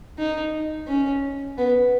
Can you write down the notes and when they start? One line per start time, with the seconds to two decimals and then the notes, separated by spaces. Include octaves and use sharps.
0.18 D#4
0.87 C#4
1.58 B3